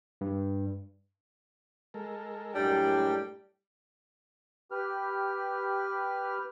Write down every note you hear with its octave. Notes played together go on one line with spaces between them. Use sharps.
G2
G#3 A4 A#4
F#2 A2 G3 D4 G5
G4 B4 F6